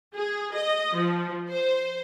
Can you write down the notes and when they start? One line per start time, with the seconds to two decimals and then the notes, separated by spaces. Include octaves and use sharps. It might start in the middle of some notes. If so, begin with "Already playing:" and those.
0.15 G#4
0.55 D#5
0.96 F3
1.51 C5